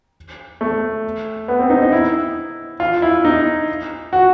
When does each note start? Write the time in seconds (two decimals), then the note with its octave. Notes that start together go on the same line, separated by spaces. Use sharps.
0.61 A3
1.48 B3
1.59 C4
1.70 D#4
1.82 D#4
1.92 E4
2.80 F4
3.02 E4
3.25 D#4
4.13 F#4